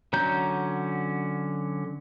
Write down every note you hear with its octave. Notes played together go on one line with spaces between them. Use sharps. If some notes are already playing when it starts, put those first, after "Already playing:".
D3 F#3 C#4 A#5 G6